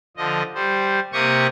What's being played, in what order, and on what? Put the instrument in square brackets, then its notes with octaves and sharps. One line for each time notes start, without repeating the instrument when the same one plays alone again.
[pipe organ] D3 F3 D#5
G3 C5
C3 A#3 G4 C#6 D#6